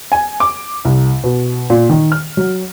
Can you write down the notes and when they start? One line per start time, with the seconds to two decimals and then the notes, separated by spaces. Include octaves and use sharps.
0.12 G#5
0.40 D6
0.85 C2
1.24 B2
1.70 A#2
1.90 D#3
2.12 F6
2.37 F#3